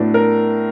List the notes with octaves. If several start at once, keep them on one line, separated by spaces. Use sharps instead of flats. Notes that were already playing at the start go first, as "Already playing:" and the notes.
Already playing: A2 F#3 B3 D4
A#4